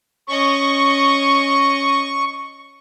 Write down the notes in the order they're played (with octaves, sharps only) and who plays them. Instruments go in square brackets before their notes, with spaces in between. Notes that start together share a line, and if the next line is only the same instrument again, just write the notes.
[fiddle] C#4 D#5 [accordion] C#6